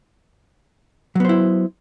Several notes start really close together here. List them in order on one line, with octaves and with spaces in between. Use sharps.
F#3 B3 C5 E4